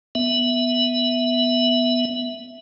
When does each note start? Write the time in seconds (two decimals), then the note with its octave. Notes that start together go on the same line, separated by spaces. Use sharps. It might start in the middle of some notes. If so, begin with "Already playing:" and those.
0.15 B3 E5